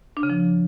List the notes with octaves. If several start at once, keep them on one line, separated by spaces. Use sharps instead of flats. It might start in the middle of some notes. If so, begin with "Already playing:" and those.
D4
C#3
F3